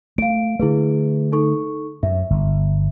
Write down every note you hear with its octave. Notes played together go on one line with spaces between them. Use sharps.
A3 F5 D7
D3 A3 E4 G#4 B4
D#4 A4 C#6
F#2 E5
G1